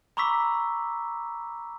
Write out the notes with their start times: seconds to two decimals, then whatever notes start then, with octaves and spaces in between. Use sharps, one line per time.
0.17 A#5 B5 C#6 D6 E6 B6